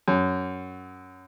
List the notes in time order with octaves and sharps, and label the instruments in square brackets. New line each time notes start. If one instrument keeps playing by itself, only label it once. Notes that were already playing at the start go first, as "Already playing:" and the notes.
[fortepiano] F#2